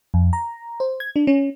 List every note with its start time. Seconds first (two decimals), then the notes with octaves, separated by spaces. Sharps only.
0.14 F2
0.33 A#5
0.80 C5
1.00 G#6
1.16 D4
1.27 C#4